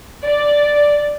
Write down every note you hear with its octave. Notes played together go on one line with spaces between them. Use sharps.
D5